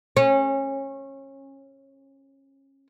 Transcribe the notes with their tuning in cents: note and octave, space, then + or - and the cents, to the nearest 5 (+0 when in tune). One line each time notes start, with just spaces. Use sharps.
C#4 -25